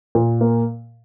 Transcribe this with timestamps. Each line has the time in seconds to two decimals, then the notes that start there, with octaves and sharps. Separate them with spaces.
0.15 A#2
0.41 A#3